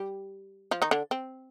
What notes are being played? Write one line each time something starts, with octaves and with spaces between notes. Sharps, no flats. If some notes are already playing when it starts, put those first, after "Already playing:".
Already playing: G3 G4
F3 F4
D#3 D#4
D3 D4
C4